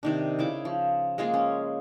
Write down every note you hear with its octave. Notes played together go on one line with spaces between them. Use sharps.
C3 D#3 D4
C#3 E4 D6
F3
G#3 A#3 F4 G#4
C#4